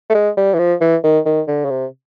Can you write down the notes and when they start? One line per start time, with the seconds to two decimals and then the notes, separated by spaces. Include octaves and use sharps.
0.10 A3
0.14 G#3
0.37 G3
0.54 E3
0.59 F3
0.81 E3
1.04 D#3
1.26 D#3
1.48 D3
1.65 C#3
1.70 C3